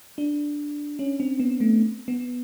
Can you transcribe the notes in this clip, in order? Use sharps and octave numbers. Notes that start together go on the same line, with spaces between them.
D4
C#4
C4
B3
A3
B3